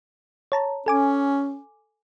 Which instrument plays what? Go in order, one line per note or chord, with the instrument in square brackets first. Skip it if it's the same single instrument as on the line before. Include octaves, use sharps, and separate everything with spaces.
[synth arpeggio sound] C#5 A5 A#5
[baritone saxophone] C#4 [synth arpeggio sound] A4 G#5 D6